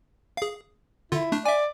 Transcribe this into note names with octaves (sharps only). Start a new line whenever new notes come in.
G#4 F5
D3 E4 F4
A3 D4
D5 E5 G#5